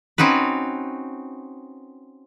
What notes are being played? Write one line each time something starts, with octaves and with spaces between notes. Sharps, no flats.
C4 C#4 D#4 F#4 B4